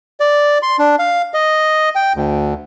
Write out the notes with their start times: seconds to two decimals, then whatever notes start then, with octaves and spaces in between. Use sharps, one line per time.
0.20 D5
0.62 C6
0.79 D4
0.99 F5
1.34 D#5
1.95 G5
2.16 D2